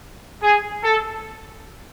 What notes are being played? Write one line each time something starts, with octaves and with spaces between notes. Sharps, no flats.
G#4
A4